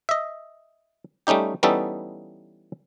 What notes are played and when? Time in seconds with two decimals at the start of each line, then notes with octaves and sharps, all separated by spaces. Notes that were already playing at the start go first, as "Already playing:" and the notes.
0.09 D#5 E5
1.27 G3 A3 C#4 D#4 G4
1.63 E3 G3 B3 C#4 D#4 A4